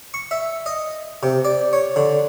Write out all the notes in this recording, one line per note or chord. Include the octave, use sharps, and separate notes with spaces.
C#6
E5
D#5
C3
D5
C#5
D3